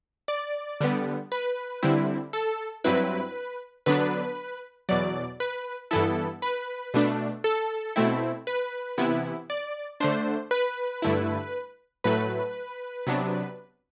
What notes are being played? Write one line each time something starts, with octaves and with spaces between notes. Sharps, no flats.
D5
D3 G3 B3
B4
D3 G3 C4 E4
A4
G2 F#3 C4 E4 B4
D3 F#3 B3 D4 B4
E2 B2 F#3 D5
B4
G2 E3 B3 E4 A4
B4
B2 A3 D4
A4
B2 A3 C4 E4
B4
C3 E3 B3 E4
D5
D3 A3 D4 C5
B4
G2 D3 A3 E4
A2 F#3 A3 B4
C3 F#3 B3 D4